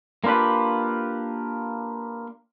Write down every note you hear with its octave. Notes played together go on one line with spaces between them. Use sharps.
A#3 D4 F4 G4 B4